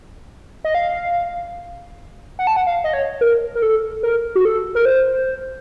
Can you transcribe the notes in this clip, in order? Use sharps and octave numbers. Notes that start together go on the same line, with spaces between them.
D#5
F5
F#5
A5
F#5
F5
D#5
C#5
A#4
A#4
A4
A#4
F#4
A4
A#4
C5